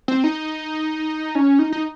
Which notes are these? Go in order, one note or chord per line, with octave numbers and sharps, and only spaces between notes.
C4
D#4
C#4
D#4
D#4